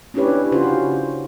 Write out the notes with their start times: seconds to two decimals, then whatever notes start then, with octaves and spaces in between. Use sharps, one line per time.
0.14 C#4 D4 E4 G4 B4 C#5
0.52 C#3 C#4 F4 F#4 C5